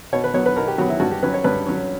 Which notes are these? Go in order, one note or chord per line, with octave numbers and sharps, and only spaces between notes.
B2 C#5
B4
F#3 B3 C#5
B4
B2 A#4
G4
F#3 B3 F#4
E4
G2 F#4
G4
F#3 C#4 B4
C#5
G2 B4
F#3 C#4